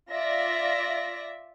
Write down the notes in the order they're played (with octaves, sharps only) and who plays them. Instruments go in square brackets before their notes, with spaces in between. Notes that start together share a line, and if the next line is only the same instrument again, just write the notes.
[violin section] F4 D5 E5 A#6